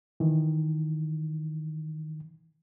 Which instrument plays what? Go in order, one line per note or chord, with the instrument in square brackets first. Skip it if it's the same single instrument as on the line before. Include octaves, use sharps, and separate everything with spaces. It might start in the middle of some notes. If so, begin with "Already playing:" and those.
[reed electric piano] D#3 E3